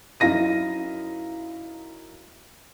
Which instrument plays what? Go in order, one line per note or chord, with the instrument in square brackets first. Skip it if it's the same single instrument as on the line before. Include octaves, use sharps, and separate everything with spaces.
[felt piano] F#2 D#4 E4 F5 A#6 D#7